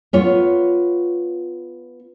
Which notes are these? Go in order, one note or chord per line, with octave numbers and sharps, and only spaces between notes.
B3 F4 C#5